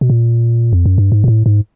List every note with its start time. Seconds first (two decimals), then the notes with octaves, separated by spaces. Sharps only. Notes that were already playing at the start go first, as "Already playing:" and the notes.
0.01 B2
0.10 A#2
0.73 F2
0.86 F#2
0.98 G2
1.12 G#2
1.24 A#2
1.28 A2
1.46 G#2